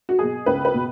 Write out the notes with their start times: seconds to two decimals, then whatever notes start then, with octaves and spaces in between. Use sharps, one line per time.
0.09 F#4
0.19 B2 F#3 G#4
0.46 C#2 B4
0.65 B4
0.74 B2